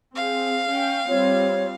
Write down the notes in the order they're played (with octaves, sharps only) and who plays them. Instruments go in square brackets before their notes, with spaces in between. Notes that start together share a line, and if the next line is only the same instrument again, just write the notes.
[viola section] C4 G#4 [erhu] F5
[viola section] C#4 G5
[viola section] G3 C4 F4 [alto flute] C#5